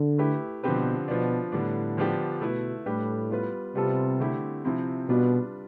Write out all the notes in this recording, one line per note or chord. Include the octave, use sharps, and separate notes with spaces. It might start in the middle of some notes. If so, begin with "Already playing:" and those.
Already playing: D3
A3 E4 G4 B4
B2 D3 F3 C4 G4 B4
B2 F3 B3 D4
A2 D3 G3 B3 D4
D3 F3 B3 D4 G4
B2 A3 E4 B4
A2 G3 D4 G4 B4
G3 B3 F4 B4
C3 G3 B3 F4 A4
D3 A3 C4 E4 G4
C3 F3 C4 E4
B2 G3 D4 F4 B4